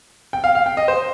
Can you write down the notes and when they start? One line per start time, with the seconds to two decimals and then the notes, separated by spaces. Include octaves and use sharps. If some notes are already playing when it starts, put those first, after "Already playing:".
0.33 G5
0.44 F5
0.55 F5
0.66 G5
0.77 D#5
0.88 C5